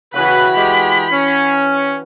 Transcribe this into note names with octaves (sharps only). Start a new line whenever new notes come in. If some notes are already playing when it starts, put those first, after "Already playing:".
C#3 E3 F#4 B4 G5 B5
G#3 G4
C#4